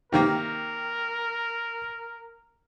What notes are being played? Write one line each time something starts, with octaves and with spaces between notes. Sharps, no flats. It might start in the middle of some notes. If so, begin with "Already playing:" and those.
C3 D#3 A#3 A#4